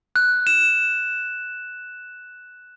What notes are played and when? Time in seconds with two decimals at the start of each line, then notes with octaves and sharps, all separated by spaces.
0.16 F#6
0.47 E7